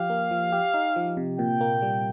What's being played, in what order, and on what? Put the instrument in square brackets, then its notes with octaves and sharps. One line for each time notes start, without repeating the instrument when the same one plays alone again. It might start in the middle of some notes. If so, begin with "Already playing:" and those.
Already playing: [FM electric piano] F3 G4 [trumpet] F5
[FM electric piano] A#3
F3
G4
D#4
F3
C3
[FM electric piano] A#2 [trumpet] G5
[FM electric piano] A#3
G3